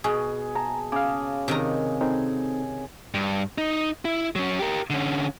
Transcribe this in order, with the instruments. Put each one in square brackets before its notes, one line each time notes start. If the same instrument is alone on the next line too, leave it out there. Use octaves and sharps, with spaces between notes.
[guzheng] B2 [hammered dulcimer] G#4
[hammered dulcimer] A5 [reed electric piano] A#5
[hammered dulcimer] C#3 [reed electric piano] F5 D6
[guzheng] C3 D#3 A#5
[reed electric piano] C4 D#4 A4
[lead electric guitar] G2
D#4
E4
F#3 C#4
G4 A#4
D3 C#4